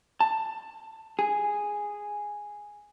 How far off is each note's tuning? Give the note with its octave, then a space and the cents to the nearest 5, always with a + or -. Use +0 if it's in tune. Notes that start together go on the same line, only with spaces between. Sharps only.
A5 +10
G#4 -5